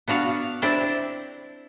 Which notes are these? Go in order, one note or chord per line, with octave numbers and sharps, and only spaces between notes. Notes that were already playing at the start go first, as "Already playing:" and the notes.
B3 D4 F#4 F5
C4 D4 E4 G5 A5